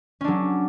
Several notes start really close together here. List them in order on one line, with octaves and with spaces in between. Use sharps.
C#4 D4 F#3